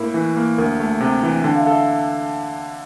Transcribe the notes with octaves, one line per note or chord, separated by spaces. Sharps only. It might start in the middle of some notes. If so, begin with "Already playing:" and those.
Already playing: A2 A#3 E4 A#4
E3
A#3
D2 A#4
A3
C3
E3
D3 G5
F5
E5
A4 F5
E5